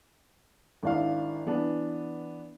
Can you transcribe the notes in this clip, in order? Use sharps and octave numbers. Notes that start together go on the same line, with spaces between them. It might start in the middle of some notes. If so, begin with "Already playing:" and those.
G#1 D4 E4 F5
E3 B3 D4